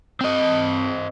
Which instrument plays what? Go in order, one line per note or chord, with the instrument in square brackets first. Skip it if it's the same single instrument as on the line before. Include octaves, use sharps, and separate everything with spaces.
[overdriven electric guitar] C4 D#5